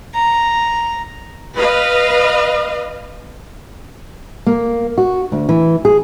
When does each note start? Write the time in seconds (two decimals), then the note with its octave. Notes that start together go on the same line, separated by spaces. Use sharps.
0.14 A#5
1.56 B4 D#5 F5
4.46 A#3
4.98 F#4
5.32 D2
5.49 E3
5.85 G#4